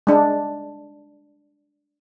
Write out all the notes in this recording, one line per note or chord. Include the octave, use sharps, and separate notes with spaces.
G#3 D4